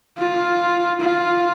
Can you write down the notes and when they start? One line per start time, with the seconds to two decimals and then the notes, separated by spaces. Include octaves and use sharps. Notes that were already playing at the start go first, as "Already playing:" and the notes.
0.18 F4
1.00 F4